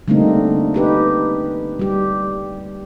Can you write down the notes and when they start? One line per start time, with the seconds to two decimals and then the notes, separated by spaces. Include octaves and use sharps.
0.08 D3 G3 A3 A#3 C4 D#4
0.74 D#4 G4 B4
1.79 G3 G4